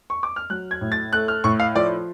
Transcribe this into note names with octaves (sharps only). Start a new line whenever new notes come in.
C#6
D6
F6
F#3 F#6
G#6
A2
A6
A3 F#6
F6
A2 C#6
F5
F3 D5